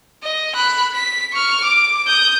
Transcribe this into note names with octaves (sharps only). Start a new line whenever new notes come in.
D#5
B5 F#6
B6
C#6 F6
D6
D#6 G6